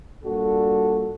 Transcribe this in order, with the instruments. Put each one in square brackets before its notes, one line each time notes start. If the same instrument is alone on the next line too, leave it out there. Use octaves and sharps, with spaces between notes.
[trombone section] A#2 G3 D4 F#4 A4